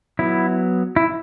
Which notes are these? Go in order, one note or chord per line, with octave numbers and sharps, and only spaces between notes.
F#3 B3 E4
E4